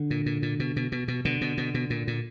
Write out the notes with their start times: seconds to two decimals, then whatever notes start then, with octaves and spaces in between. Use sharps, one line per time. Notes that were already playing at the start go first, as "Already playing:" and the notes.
Already playing: D3
0.10 A#2
0.26 A#2
0.42 A#2
0.60 B2
0.76 B2
0.92 B2
1.08 B2
1.25 B2 D3
1.41 B2
1.58 B2
1.74 B2
1.90 A#2
2.07 A#2